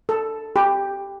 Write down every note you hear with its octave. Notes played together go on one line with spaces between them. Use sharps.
A4
G4